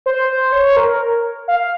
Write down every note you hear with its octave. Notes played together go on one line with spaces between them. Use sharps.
C5
C#5
A#4
F5